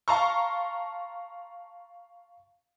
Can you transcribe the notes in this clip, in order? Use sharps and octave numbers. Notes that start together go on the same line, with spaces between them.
F5 A5 A#5 C6 C#6